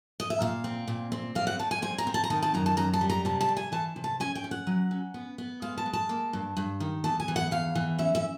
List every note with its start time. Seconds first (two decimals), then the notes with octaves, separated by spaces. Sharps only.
0.20 D#5
0.30 E5
0.40 A#2 F5
0.64 C4
0.88 A#2
1.12 C4
1.35 G3 F5
1.47 F#5
1.59 G3 A5
1.71 G#5
1.82 C4 G#5
1.98 A#5
2.07 C4
2.14 A5
2.24 A#5
2.30 D#3 A5
2.42 A5
2.54 F#2 A#5
2.66 A5
2.77 F#2 A#5
2.93 A5
3.01 G3
3.10 A#5
3.25 C3 A5
3.41 A5
3.48 C3
3.57 G#5
3.72 E3 A5
3.96 C3
4.04 A5
4.20 C#4 G#5
4.35 G5
4.44 C#4
4.51 F#5
4.67 F#3
4.91 C#4
5.14 B3
5.38 B3
5.62 G#3 F5
5.78 A5
5.86 G#3
5.93 A5
6.09 A#3
6.33 G2
6.57 G2
6.80 D#3
7.04 E2 A5
7.20 G#5
7.28 E3
7.36 F#5
7.51 E2 F5
7.75 E3
7.99 C#4 E5
8.15 E5